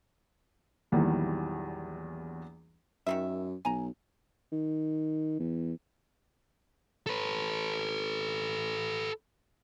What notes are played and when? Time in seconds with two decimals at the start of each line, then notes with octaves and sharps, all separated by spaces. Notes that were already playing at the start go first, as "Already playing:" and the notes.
0.92 A#1 E2 D#3 E3 F#3 G3
3.07 F#2 D#3 A#3 E5
3.65 B1 G#5 A#5
4.52 D#3
5.40 E2
7.06 A4 B4